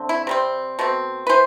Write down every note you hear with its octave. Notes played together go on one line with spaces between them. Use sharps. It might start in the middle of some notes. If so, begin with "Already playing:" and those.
Already playing: D3 A3 C4
E4
C3 G3 C4
B2 A3 C4
B4
E3 C5